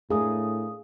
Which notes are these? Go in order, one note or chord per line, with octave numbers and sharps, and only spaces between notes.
A2 A3 D4 G#4 A#4 F5 D#6